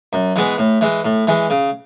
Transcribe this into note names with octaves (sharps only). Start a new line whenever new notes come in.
F#2
E3 G#3 B3
A2
E3 G#3
A2
E3 G#3
C#3